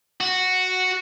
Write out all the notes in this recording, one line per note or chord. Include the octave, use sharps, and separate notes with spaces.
F#4